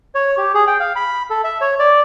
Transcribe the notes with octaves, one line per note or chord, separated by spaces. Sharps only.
C#5
G4
G#4
G5
F5
B5
A4
E5
C#5
D5